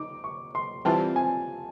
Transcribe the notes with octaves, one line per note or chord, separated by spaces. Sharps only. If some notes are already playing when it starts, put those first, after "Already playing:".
Already playing: D#4 D6
C#6
C6
E3 G3 C4 F4 A5
G#5